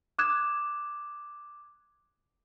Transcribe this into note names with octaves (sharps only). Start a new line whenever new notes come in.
D6 D#6 F#6 G#6 E7